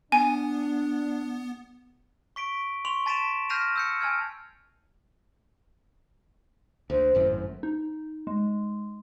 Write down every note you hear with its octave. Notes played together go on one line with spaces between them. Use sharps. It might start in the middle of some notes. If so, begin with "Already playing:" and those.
B3 D4 G#5
C#6 B6 D7
C6 C#6 F7 F#7
A5 A6 B6 D7 E7 F7
F6 G6 A#6 C7 D#7 F7
E6 G6 C#7
G#5 A5 F6 G#6
D2 C5
G#1 F#2 A2
D#4
G#3